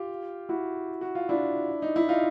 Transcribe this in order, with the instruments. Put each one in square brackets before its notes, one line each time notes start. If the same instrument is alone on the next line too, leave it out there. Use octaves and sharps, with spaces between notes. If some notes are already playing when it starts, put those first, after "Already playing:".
Already playing: [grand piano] F4 G4
E4 F#4
F#4
F4
D4 E4
D#4
E4
D#4 F4